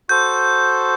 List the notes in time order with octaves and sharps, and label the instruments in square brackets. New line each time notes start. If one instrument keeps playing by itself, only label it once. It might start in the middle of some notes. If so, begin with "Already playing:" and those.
[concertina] F#4 A4 C5 [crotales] G6